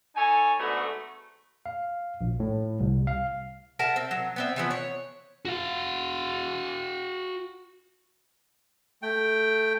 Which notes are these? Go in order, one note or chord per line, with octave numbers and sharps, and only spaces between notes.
D#4 A4 C#5 G#5
G#2 D3 A3 B3 F#4
F5
A#1
A2
C2
F5
A#4 E5 F#5 A5
C4
F#3
B3 C4 E5
E3 F3 B3
C#5
F#4 F5
A3 G5